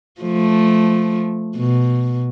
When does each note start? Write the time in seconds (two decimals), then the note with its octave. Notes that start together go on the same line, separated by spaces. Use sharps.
0.21 F3 A3
1.57 B2